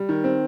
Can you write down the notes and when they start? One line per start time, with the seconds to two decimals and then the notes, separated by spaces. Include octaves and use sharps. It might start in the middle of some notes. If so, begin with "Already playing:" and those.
Already playing: G3
0.09 D#3
0.24 C4